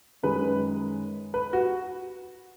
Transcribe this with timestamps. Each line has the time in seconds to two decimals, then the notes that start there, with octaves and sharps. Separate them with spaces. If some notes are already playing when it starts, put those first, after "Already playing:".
0.23 F#2 D#3 G#3 B4
1.34 B4
1.53 F#4